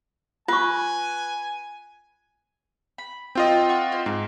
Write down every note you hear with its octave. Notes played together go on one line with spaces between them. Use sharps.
F4 B4 G#5 C#6
B5
C4 F4 D#5 G5
F#5 C#6
E4 C5
G#2 C4